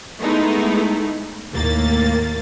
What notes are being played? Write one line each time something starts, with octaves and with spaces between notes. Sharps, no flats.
G#3 A3 B3 D#4 E4
D#2 A2 A#3 A6